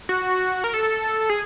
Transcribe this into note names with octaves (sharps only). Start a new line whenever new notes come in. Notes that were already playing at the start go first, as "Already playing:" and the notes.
F#4
A#4
A4
G#4